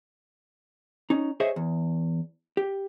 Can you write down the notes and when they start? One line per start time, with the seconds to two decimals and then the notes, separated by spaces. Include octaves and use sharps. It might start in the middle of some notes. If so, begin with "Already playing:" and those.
1.10 C#4 D#4
1.40 G#4 C5 C#5 D#5 E5
1.56 E2
2.57 G4